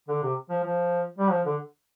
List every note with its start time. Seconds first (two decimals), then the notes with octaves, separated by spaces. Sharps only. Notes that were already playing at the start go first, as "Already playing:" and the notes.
0.09 D3
0.23 C3
0.50 F3
0.63 F3
1.18 G3
1.31 F3
1.45 D3